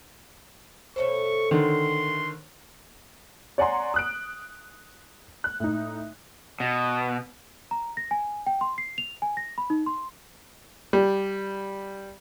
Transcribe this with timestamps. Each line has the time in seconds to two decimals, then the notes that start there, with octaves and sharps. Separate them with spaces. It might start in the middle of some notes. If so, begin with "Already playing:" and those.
0.96 B2 A3 A4 C5 C#5 C#6
1.51 D3 D#3 C6
3.58 C#5 D5 F#5 G#5 A#5 C6
3.94 D#6 F#6 D7
5.44 F#6
5.60 A2 D#4
6.60 B2
7.71 A#5
7.97 A#6
8.11 G#5
8.46 G5
8.61 C6
8.78 C7
8.98 F7
9.22 G#5
9.37 A#6
9.58 B5
9.70 D#4
9.86 C6
10.93 G3